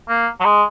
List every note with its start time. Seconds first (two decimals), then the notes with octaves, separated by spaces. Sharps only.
0.09 A#3
0.40 F#3
0.44 G#3